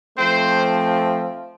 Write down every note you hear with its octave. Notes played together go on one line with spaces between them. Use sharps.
F3 A3 C4 C5